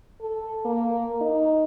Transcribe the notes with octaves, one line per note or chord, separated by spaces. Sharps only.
A4
A#3
D#4